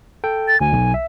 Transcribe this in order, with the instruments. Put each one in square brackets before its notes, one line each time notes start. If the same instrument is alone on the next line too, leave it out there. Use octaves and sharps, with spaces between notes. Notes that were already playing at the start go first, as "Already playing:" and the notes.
[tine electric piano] A4 G5
[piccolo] A6
[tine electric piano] D2 [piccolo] G#5
[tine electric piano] B1
E5